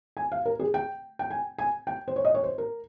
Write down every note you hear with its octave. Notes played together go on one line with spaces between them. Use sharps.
G#5
F5
A#4
G#4
G5
G5
G#5
G#5
G5
C5
C#5
D#5
C#5
C5
A#4